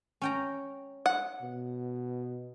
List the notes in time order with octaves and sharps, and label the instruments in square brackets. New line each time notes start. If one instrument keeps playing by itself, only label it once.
[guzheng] C#4 G5 A#5
[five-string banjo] F#5
[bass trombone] B2